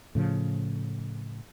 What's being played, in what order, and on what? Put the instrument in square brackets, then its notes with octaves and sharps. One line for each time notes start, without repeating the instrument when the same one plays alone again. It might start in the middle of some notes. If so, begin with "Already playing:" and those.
[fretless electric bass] A2 C#3 F3